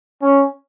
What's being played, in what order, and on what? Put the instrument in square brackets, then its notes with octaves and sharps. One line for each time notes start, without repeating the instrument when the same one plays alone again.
[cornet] C#4